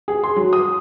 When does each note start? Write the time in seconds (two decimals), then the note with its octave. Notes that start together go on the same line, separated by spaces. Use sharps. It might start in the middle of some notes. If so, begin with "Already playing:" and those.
0.08 G#4
0.23 C6
0.36 F#3
0.53 D#6